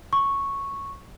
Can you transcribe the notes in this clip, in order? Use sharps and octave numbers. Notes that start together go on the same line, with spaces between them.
C#6